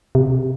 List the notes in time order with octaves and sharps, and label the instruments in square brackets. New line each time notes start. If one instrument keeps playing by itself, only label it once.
[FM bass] C3